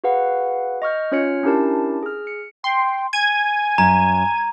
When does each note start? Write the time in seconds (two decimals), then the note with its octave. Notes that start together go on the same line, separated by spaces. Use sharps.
0.04 F#4 G#4 B4 F5 F#5
0.82 D#5 C#6 F6 G6
1.12 C#4 F4 C#5 F6 C#7
1.43 C#4 D4 E4 G4 A#4 A5
2.03 G#4 F6
2.27 C#7
2.64 G5 C6
3.13 G#5 G#6 D#7
3.78 F#2 A#5